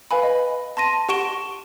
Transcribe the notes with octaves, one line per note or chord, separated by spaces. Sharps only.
B4 F5 G#5 B5
D#5
A5 C6 A#6 D#7
G4 F#5 C#6 D7 E7 G7